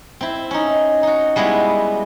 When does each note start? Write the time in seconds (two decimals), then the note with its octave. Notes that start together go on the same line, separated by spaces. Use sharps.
0.21 C4 E4
0.51 C#4 D#4
1.03 D#4 F#4
1.36 G3 G#3 B3 E4 F#4